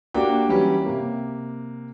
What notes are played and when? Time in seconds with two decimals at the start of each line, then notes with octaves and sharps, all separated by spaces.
0.14 A#3 D4 F#4 G4 G5 D6
0.48 E3 F#3 G3 C#4 G4
0.86 C3 A#3